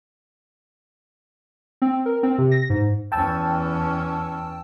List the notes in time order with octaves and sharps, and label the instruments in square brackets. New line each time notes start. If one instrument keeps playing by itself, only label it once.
[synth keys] C4
A#4
C4
C3
A#6
G#2
[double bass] E2 C#4 [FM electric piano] G5 A5 E6